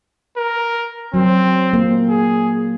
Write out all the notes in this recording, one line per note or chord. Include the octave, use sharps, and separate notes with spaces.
A#4
F#3 C4
A#3
G#4